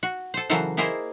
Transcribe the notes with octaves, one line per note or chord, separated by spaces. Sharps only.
F#4
A4 C5
C#3 E3 F#3 A4 A#4 C5
A#3 E4 G#4 A#4 C5 D#5